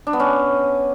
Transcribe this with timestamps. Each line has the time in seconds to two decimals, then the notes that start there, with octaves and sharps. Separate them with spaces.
0.07 D4
0.13 B3
0.20 C#4